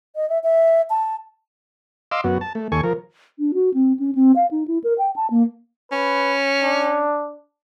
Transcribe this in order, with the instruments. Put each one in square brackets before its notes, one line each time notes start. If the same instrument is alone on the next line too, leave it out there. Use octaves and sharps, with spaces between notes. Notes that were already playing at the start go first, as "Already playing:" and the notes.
[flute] D#5
E5
E5
A5
[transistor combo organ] D#5 F5 C6 D6 E6
F#2 B3 F#4
A5
A3
D#2 A4 G#5 C#6
F3 A#4
[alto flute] D4
F#4
C4
C#4
C4
F5
D#4
E4
A#4
G5
A5
A#3
[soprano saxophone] C#4 [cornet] B4
[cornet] D4